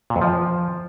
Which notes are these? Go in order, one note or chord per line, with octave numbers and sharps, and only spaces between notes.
A#2
F2
F3